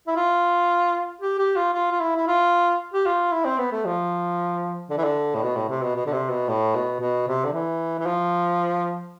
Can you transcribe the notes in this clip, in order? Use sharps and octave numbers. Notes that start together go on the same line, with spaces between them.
E4
F4
G4
G4
F4
F4
F4
E4
E4
F4
G4
F4
E4
C4
B3
A3
F3
D3
E3
D3
A2
B2
A2
C3
B2
B2
D3
C3
B2
A2
B2
B2
C3
D3
E3
E3
F3